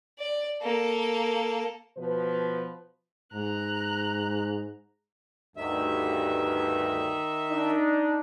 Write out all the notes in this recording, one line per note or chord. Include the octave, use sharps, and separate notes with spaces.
D5
A#3 A4
B2 F3 B4
G#2 A#5 F#6
D2 G2 D#3 E5
D4 D#4